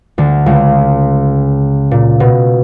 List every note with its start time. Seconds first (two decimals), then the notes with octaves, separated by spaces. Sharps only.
0.18 D2 D3
0.46 C#2 C#3
1.91 A#2
2.20 B2